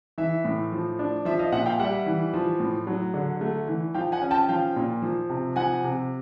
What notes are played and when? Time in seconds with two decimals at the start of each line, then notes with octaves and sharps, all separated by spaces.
0.18 E3 E5
0.45 A2
0.72 F3
0.99 D4
1.25 F3 E5
1.39 D#5 F5
1.52 A#2 E5 F#5
1.66 F5 G5
1.79 G3 E5 F#5
2.06 E3
2.34 F3
2.60 A2
2.87 F#3
3.14 D3
3.41 A3
3.68 E3
3.95 F3 F5 G5
4.12 F#5 G#5
4.22 C#4
4.31 G5 A5
4.49 F3 F5 G5
4.76 A#2
5.02 F3
5.29 C3
5.56 F3 F#5 G#5
5.84 C3